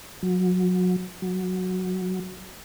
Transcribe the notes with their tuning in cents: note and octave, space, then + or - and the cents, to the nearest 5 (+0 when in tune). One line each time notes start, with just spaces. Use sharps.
F#3 -25
F#3 -5